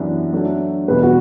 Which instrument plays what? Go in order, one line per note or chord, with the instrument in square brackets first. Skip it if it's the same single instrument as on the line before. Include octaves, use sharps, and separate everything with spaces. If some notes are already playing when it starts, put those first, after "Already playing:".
Already playing: [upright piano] F#2 E3 B3 D4 G4
F#3 A3 D4
[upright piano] E2 B2 G3 [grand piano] B4
[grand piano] F#4